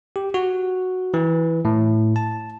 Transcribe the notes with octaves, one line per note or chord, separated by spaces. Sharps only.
G4
F#4
E3
A2
A5